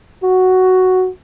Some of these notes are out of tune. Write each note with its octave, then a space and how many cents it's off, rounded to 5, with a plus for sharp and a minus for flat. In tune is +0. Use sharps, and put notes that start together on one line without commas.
F#4 +5